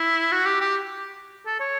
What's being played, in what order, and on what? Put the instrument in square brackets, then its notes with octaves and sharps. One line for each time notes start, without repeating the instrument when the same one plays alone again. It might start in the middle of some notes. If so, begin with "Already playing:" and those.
Already playing: [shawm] E4
F#4
G4
G4
A4
C#5